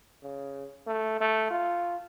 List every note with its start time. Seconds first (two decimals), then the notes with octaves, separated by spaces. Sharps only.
0.23 C#3
0.87 A3
1.21 A3
1.51 F4